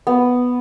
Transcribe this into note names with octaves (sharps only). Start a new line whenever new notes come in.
B3